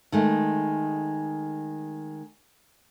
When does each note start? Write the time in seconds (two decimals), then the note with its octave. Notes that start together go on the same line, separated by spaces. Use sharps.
0.12 D#3 G#3 A3